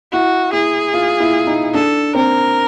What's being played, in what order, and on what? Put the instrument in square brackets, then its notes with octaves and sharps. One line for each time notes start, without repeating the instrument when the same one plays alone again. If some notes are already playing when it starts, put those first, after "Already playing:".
[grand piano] E4 [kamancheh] F#4
[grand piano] E4 [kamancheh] G#4
[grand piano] F4
E4
D#4
[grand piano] D4 [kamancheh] A4
[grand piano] C4 [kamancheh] A#4